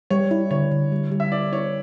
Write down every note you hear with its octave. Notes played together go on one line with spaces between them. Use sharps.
G3 C#5
E4
D3 C#5
D3
G3
G3
E5
E4 D5
E4 C#5